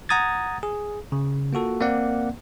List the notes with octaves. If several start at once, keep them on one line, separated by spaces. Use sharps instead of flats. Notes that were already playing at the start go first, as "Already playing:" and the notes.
F#5 A#5 D#6 G#6 A6
G#4
C#3
A#3 F4 F#4 A4
A#3 C4 D5 F#5